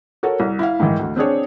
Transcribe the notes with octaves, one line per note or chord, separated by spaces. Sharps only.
F#4 A4 A#4 C#5
C2
E4 F5
G#2 D#3 E3
D2
C4 D4 G#4 C#5